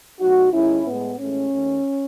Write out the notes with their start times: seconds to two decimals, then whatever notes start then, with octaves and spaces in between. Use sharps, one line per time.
0.20 B2 F#3 A3 D#4 F#4
0.53 D#2 D#3 G#3 C#4 E4
0.86 A2 G#3 B3
1.19 A2 E3 G#3 A3 C#4
1.52 D#2 D#3 A3